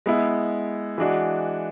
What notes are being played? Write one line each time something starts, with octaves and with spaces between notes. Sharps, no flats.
G#3 B3 E4
E3 G#3 D4 F#4